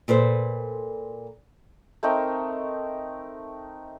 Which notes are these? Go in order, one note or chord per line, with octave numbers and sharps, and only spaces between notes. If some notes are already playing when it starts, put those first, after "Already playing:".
A#2 A4 B4 C5
A3 C4 D#4 A#4